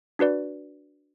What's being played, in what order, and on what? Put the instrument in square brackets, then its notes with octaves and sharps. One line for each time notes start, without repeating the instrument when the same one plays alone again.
[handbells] D4 F#4 B4 D5